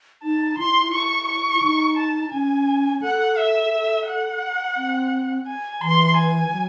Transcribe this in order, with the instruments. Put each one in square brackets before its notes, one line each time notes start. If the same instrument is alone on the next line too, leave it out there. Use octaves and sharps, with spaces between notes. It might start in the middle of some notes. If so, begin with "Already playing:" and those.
[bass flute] D#4 [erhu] A5
[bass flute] E4 [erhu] C6
[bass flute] E4 [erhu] C#6
[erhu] C#6
[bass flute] D#4
[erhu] A5
[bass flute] C#4 [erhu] G#5
[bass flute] A4 [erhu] F#5
[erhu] E5
[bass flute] A4
[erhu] F#5
[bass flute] C4
[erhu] G#5
[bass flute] E3 [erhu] C6
[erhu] G#5
[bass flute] F#3